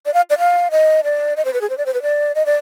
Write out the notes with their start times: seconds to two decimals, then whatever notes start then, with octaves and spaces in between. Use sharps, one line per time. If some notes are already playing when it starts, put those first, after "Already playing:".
0.06 D5
0.14 F5
0.30 D5
0.39 F5
0.71 D#5
1.04 D5
1.36 D#5
1.45 C5
1.53 B4
1.61 G#4
1.70 C5
1.78 D5
1.86 C5
1.94 B4
2.02 D5
2.35 D#5
2.46 D5